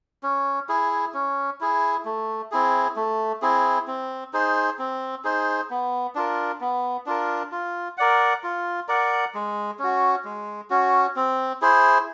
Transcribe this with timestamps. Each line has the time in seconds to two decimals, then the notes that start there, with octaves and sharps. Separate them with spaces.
0.23 C#4
0.69 E4 G#4
1.14 C#4
1.61 E4 G#4
2.05 A3
2.52 C4 E4 G#4
2.96 A3
3.42 C4 E4 G#4
3.87 C4
4.33 D#4 G#4 C5
4.79 C4
5.24 D#4 G#4 C5
5.70 B3
6.15 D4 F4 A#4
6.61 B3
7.06 D4 F4 A#4
7.52 F4
7.97 A#4 D5 F#5
8.44 F4
8.88 A#4 D5 F#5
9.35 G#3
9.79 C#4 F#4
10.25 G#3
10.70 C#4 F#4
11.16 C4
11.62 E4 G#4 C5